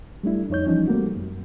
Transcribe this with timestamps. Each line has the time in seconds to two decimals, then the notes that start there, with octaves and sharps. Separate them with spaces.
0.23 G3 A3 D4 E4
0.50 F2 D#4 C#5 G6
0.66 E3 F3 G3 C#4 D#4
0.87 G3 A3 A#3 C4 F#4
1.16 F#2